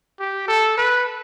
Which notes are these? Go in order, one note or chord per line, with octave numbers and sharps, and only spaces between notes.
G4
A4
B4